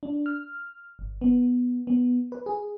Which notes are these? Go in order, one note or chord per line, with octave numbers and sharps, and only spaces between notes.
D4
F6
G1
B3
B3
B4
G#4